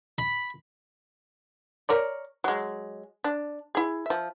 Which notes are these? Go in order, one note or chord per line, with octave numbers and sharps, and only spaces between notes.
B5
A#4 C#5 D5
F#3 G#3
D4
E4 G#4
F3 E5